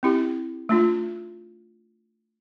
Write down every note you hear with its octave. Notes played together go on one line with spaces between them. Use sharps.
C4 E4 G4
A3 D4 F4